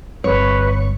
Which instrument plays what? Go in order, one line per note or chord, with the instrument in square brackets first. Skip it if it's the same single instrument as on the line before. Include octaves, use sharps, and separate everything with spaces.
[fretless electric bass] G1 G3 C4 [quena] B4 [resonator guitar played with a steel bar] C#5